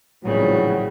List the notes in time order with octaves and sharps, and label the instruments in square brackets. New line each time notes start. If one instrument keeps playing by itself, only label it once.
[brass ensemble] A#1 E3 F#3 [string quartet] A2 C#3 G3